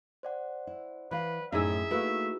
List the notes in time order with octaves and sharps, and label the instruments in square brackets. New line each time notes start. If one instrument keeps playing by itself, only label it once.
[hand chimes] C5 D5 F#5
[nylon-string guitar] E4
[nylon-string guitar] E3 F5 [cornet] B4
[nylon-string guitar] F#2 A2 [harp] D#4 E4 G#4 [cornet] E5
[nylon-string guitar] A3 A#3 [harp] E4 F#4 B4